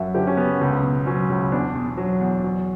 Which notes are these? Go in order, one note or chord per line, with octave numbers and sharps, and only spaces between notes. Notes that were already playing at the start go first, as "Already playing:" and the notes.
Already playing: F#2 F#3 E5 F#5
D3 G4
C#4
F#1 B3
C#2 B3
B2
F#3 C#4
C#2
E2 D4
B2
F#3
E2
F#3